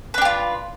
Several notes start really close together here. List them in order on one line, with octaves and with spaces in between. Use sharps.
B4 D4 G4 F4